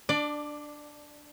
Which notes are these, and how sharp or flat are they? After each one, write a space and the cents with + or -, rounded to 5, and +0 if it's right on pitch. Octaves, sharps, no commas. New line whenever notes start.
D4 +0 D5 +20